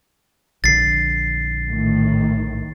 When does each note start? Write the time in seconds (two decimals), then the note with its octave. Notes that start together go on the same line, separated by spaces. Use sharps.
0.64 A#1 D3 A6 C7
1.70 A2 D#3